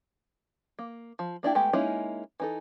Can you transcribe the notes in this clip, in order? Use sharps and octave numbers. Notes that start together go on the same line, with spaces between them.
A#3
F3
A#3 D4 E4 G4
G#3 A3 B3 G4
G#3 A#3 C#4 D#4 E4
E3 D#4 A4